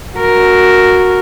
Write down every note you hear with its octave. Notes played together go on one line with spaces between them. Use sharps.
F#4 A#4